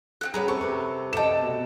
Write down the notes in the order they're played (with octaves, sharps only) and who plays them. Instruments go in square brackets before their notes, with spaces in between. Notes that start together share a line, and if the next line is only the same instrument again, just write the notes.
[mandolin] C4 E4 F#6 [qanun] A4
[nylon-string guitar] G3 [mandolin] B3 B4 A#5 [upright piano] C#4 G#4
[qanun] C3 [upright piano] A4 [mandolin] C#6
[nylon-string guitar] G4 A#4 B4
[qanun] A3 [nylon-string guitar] F#4 A4 D#5 [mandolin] D5 G5 [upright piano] A5 E7
[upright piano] B2